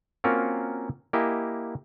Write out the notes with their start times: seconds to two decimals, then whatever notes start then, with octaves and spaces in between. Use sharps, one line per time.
0.24 A#3 C4 C#4 F4 F#4 A#4
1.13 A#3 E4 G4 D#5 G#5